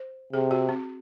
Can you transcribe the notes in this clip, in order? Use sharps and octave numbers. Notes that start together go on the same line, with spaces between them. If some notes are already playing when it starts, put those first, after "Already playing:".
Already playing: C5
C3 G#4
F#4
C4